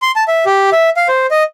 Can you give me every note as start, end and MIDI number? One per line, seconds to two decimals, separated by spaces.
0.02 0.11 84
0.16 0.24 81
0.28 0.45 76
0.46 0.70 67
0.72 0.90 76
0.97 1.08 77
1.08 1.26 72
1.31 1.43 75